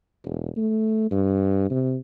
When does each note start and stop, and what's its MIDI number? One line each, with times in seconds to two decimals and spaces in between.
0.25 0.49 28
0.57 1.06 57
1.11 1.69 43
1.71 1.96 48